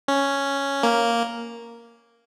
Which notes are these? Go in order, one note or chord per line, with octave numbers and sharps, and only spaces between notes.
C#4
A#3